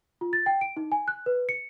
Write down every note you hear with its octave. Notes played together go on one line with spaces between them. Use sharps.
F4
A6
G5
D7
D#4
G#5
F#6
B4
C#7